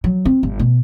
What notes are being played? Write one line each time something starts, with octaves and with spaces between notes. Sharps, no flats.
F#3
C4
G1
B2